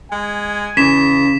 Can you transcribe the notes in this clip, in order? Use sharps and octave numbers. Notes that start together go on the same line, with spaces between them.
G#3 G#5
E2 C#3 B6 E7